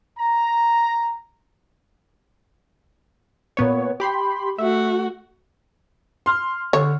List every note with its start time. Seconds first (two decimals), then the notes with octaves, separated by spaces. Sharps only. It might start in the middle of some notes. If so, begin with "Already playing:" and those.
0.18 A#5
3.57 A#2 B3 C#5
4.00 G4 B5 C6
4.58 A3 F#4 E5
6.26 C6 F6
6.73 D3 C#5